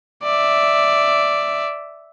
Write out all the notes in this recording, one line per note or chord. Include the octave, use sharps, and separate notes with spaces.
D5 E5